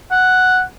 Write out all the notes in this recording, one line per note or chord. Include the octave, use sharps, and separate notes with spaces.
F#5